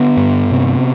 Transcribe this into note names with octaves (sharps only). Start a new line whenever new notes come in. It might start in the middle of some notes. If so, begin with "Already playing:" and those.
Already playing: D3 B3
G2
C3